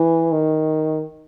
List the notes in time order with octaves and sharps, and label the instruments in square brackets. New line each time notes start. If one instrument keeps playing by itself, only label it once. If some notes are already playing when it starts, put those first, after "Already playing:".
Already playing: [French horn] E3
D#3